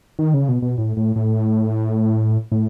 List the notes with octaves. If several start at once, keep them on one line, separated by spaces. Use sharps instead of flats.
D#3
C#3
B2
B2
A2
A2
A2
A2